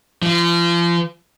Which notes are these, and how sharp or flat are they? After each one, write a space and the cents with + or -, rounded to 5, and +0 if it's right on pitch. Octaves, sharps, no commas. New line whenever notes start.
F3 -35